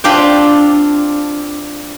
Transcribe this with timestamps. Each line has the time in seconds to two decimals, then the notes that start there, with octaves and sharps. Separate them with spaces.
0.04 C4 D4 F4 G4 C5 G5